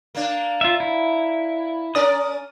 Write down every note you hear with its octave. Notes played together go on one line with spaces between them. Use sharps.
A#3 D4
F4 E5
E4
C#4 A#4 D5 D#6